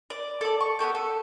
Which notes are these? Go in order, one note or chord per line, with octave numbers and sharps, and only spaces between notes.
D5
A4 D5
C#6
B3 G4 A4 G5
A4